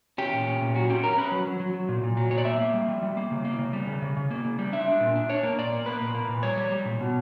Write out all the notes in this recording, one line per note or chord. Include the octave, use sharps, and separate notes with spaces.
C#4 G4
A#2
C#4
A#2
F#3 F#4
C#4 G4
C#4 A#4
C#4 B4
F#3
F#3
F#3
F#3
A#2
A#2
F#3
A#2 C#5
D5
A#3 E5
A#3
G3
G3
G3
A#3
C#3
A#3
C#3
G3
C#3
C#3
C#3
A#3
C#3
G3
D4 E5
D4
A#2
D4
D4 C#5
A#3
A#2 D5
A#3
A#3 B4
A#2
A#3
A#2
G3 C#5
G3
G3
A#2
B2